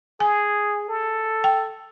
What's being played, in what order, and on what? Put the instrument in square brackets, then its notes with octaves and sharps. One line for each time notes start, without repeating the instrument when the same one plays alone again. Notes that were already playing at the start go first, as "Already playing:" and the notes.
[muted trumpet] G#4 [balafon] G#5
[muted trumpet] A4
[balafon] G5